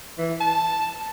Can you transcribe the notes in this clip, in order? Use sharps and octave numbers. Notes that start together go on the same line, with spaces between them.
E3
A5